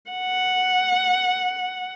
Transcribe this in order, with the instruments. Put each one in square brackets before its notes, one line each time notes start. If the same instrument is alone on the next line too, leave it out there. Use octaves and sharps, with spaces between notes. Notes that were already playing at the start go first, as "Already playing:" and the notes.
[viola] F#5